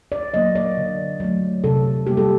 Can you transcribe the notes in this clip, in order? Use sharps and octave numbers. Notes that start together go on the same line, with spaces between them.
D5
F#3 A#3 D#5
D5
D3
F#3 A3
C3 A4
G3 A#3 G4
A4